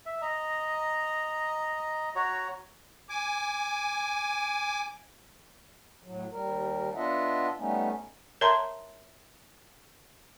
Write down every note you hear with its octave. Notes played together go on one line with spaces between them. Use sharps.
E5
D#5 A#5
F#4 C#5 A#5
G#5 D6
A2 F#3
D#2 G3 A#4
B3 D4 F4 D#5 E5 F#5
G3 A3 B3 C#4 D#4
A#4 C#5 E5 A5 A#5 C6